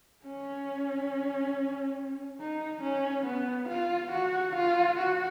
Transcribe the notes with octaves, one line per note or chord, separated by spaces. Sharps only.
C#4
D#4
C#4
B3
F4
F#4
F4
F#4